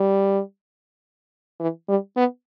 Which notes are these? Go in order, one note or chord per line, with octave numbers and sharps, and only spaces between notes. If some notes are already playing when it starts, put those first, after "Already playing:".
Already playing: G3
E3
G3
B3